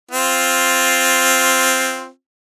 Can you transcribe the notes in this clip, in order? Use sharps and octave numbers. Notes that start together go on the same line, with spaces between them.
C4 F4